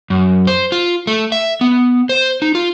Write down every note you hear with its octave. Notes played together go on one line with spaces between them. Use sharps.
F#2
C5
F4
A3
E5
B3
C5
D#4
F4